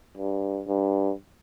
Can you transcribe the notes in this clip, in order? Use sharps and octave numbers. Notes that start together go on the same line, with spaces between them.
G2
G2